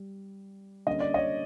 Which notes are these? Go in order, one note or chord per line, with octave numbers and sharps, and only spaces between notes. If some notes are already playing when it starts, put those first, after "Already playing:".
Already playing: G3
D3 G3 A#3 C#4 D#5
D5
C#5 D#5